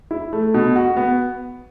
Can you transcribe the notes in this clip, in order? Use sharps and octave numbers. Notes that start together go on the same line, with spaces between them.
E4
A3
B2
F#4
B3